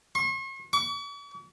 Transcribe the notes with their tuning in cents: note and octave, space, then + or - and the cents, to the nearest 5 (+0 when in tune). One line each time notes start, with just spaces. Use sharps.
C#6 -45
C#6 +45